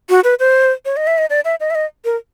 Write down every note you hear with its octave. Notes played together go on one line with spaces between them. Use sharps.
F#4
B4
C5
C#5
D#5
E5
D#5
D5
E5
D#5
E5
D#5
A#4